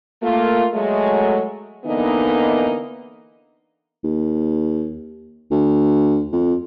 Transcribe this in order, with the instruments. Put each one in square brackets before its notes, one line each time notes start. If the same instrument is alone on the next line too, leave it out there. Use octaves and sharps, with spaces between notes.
[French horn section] A3 A#3 F4
F#3 G#3 A3
D3 E3 A#3 B3 D#4
[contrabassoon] D#2
D2
F2